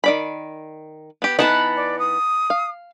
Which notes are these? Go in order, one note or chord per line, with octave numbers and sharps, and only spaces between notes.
D#3 D5 B5
B3 G4
E3 B3 D#4 F#5 A5 B5
D5
D#6
F5